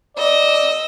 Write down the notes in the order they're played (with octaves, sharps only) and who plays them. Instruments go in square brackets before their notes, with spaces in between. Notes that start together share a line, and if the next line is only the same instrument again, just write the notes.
[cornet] D5 [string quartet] D#5 E6